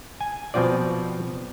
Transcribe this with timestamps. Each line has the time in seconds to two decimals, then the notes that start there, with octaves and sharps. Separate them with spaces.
0.21 G#5
0.54 B2 F3 C4 F4 D5